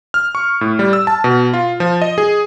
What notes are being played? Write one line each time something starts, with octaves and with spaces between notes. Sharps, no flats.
F6
C#6
A2
G3
E6
A5
B2
F4
F3
D#5
G#4